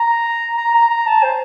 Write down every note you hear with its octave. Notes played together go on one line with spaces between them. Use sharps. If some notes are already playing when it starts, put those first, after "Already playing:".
Already playing: A#5
A#5
A#5
A#5
A5
C5